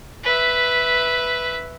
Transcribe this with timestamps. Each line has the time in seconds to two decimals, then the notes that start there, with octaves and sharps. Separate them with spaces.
0.24 B4 E5